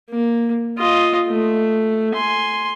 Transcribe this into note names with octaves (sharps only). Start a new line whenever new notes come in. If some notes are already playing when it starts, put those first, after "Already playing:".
A#3
F4 D#5
A3
G#5 C6